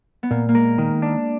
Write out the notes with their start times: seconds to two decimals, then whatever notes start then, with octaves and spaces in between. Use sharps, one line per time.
0.23 B3
0.31 A#2 A#3
0.49 A#3
0.55 G#3 A#4
0.78 D#3
1.02 D4